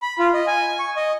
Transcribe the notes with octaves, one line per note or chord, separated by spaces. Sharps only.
B5
F4
D#5
G#5
C#6
D#5